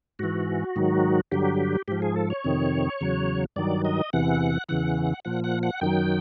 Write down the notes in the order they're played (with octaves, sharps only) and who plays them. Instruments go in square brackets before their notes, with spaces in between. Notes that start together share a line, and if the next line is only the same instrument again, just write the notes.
[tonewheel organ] G#2 E3 F#4
G#2 D#3 F#3
G2 D3 F#3 G4
G#2 F3 G4
G#4
A4
C#5
F2 C3 D#3
E2 C#3 F#3
G2 D#3 F#3 D5
D#5
E2 C3 E3 F#5
E2 C#3 E3 F#5
A#2 F3 F#5
F#5
F#5
F#2 D#3 F#3 G5